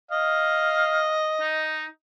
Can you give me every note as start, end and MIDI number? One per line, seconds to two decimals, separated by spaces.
0.11 1.76 75
0.11 1.17 77
1.40 1.85 63